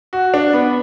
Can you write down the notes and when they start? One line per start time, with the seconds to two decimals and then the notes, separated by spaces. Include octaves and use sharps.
0.13 F#4
0.34 D4
0.53 B3